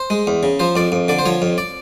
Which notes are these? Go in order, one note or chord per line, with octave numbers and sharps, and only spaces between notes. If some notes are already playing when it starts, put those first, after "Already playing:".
Already playing: C5
G#3
E2
C#3
F3 C5
F2 D5
F2
D3 D5
C5
F3 C#5
F2
D5